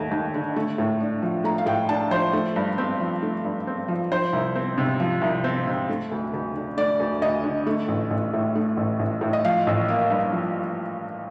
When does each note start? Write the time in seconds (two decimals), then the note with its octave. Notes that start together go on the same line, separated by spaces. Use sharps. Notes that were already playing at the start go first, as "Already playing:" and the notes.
Already playing: D#2 A3
0.11 D#2
0.34 D3
0.56 A3
0.78 A2
1.00 D4
1.22 F3
1.44 A3 A#5
1.58 F5
1.66 A2 G5
1.89 D4 A5
2.11 F3 C5
2.33 A3
2.56 G2
2.78 C4
3.00 F3
3.22 A3
3.45 G2
3.67 C4
3.88 F3
4.11 F3 C5
4.33 C2
4.56 C4
4.78 C3
5.00 F3
5.22 C2
5.44 C4
5.67 C3
5.89 A3
6.12 D2
6.34 D2
6.56 D3
6.77 A3 D5
7.00 D2
7.22 D2 D#5
7.44 D3
7.67 A3
7.88 A1
8.10 A1
8.34 A2
8.55 A3
8.77 A1
8.99 A1
9.21 A2
9.33 D#5
9.45 F3 F5
9.67 A1
9.88 A#3
10.10 G2
10.32 F3